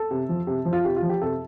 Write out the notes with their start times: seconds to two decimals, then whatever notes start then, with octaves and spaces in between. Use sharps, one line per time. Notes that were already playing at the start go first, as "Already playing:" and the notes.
Already playing: A4
0.11 C3
0.29 F3
0.47 C3
0.65 F3
0.73 F4
0.85 C3 G4
0.96 F4
1.02 F3
1.10 G4
1.21 C3 A4